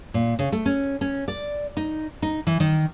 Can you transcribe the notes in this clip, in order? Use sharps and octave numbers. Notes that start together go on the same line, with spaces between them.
A#2
C#3
A3
C#4
C#4
D5
D#4
D#4
E3
D#3